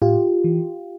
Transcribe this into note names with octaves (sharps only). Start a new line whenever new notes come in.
A2 F4 G4
E3